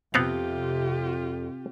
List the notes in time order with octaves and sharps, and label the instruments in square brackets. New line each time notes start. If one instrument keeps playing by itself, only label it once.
[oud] F2 [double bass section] C3 [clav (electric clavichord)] B3 C4 F5 [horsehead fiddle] F4 G4